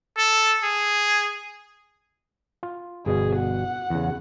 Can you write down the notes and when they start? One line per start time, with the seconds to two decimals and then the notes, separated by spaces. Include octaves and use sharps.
0.18 A4
0.64 G#4
2.63 F4
3.06 G1 B2 G#4
3.37 F#5
3.90 E2 C#3